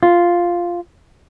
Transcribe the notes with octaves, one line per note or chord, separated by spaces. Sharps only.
F4